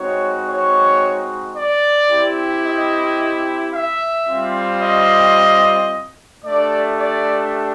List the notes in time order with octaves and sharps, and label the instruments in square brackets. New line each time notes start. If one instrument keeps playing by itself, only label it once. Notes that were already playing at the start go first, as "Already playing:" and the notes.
Already playing: [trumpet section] G#3 C4 D#4 F#4 C#5
C#5
D5
C4 E4 G4
D#5
E5
G3 C4 F4
D#5
A3 D4 G4 D5
D5